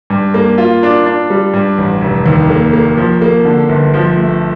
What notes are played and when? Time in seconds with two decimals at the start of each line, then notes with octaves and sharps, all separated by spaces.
0.10 G2
0.34 A#3
0.58 F4
0.83 D4
1.06 D4
1.30 G3
1.54 G2
1.78 A1
2.01 F1
2.26 D#2
2.50 A#3
2.73 A#3
2.97 F3
3.21 A#3
3.45 D3
3.69 G1
3.93 F3
4.17 A3